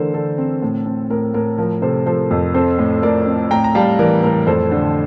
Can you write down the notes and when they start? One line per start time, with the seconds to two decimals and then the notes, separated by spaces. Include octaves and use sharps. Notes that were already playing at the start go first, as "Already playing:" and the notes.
Already playing: D3 E3 A3 A4 A#4 C5
0.14 D3 A4
0.38 C4
0.62 A2
0.86 C4
1.10 A2 A#4
1.34 A2 A#4
1.58 F3 A#4
1.82 C3 A4 C5
2.06 F3 A4 C5
2.31 F2
2.54 C4 A4 C5
2.79 A2
3.03 A2 A#4 D5
3.26 C4
3.50 A2 G5 A#5
3.64 A#5
3.75 G3 F5 A5
3.99 E3 A#4 D5
4.23 A2 A#4
4.47 F2 A4 C5
4.71 D3